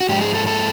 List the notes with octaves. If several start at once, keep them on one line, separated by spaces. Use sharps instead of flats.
F#4
G#2 F3 G#3 G4
G#4
A4
A4